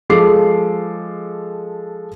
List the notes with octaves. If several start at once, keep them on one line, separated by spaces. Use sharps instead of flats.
F3 G#3 A4 D6 C7